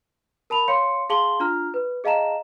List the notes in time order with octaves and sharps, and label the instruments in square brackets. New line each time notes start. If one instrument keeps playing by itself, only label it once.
[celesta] A#4 A5 B5 F7
C#5 F5 C6 C#7
G#4 F5 A5 C6 F#7 G7
D4 F4 A#5 F6
B4
G#4 D#5 F5 A5 A#5 E7